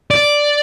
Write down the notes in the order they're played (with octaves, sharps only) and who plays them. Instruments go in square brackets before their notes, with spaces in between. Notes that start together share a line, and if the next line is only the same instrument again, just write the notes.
[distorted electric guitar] D5